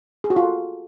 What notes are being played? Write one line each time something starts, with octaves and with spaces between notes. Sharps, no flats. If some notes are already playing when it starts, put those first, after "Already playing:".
G#4
F#4
F4
A4